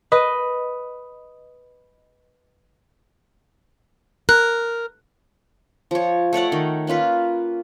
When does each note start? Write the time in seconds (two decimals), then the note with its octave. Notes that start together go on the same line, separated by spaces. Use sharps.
0.12 B4 D#5
4.29 A#4 F#6
5.91 F3 C#5
6.33 A3 C#5 D5 F#5
6.52 D#3
6.87 A#3 C#4 F4 B4